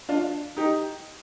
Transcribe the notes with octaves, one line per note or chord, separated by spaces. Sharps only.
D4 F4
D#4 G4